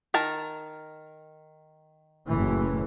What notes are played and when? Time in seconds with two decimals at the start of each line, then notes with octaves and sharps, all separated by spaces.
0.14 D#3 A#4 A5
2.28 F#1 A2 E3